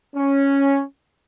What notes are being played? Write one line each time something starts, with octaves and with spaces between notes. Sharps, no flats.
C#4